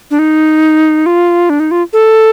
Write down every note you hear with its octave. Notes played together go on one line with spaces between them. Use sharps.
D4
D#4
F4
D4
D#4
F4
A4